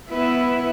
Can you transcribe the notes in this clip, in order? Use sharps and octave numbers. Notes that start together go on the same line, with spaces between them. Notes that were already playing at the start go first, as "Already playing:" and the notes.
B3 E4 B4 E5